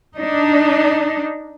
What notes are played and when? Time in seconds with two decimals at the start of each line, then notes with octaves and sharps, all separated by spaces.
0.16 D4 D#4